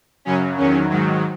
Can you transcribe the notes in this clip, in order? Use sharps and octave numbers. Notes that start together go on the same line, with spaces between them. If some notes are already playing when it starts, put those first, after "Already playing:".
F#2 C#3 F#3 C#4
E2 D#3 F#3 C#4
G#2 D#3 F#3